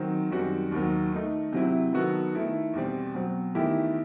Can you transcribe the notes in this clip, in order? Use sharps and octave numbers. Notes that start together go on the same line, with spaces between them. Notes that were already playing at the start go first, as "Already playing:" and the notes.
Already playing: D#3 F#3 C4
F#2 D#3 G3 C4 F#4
D#2 D#3 F#3
D#3 A3 D#4
C3 F#3 C4 E4
D#3 F#3 B3 F#4 A4
D#3 A3 E4 A4
E2 B2 G3 C4
B2 F#3 C4
E2 D#3 A3 E4 G4